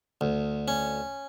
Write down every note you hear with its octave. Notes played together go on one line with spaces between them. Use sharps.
D2
C#4